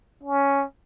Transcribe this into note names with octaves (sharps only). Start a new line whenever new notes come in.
C#4